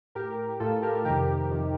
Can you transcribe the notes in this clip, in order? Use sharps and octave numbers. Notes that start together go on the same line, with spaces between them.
A2 G4 A#4
A2 F4 A4
G4 A#4
F2 C3 D#3 G4 A#4
F2 C3 D#3